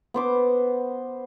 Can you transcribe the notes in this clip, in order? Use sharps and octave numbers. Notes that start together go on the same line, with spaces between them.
B3 C5 D6